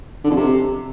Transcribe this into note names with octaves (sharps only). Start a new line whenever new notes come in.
D3
F2
C3